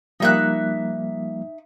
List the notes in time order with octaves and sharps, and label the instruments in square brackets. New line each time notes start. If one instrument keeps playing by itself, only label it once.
[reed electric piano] F3 G3 A#3 [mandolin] D#4 E5 F#6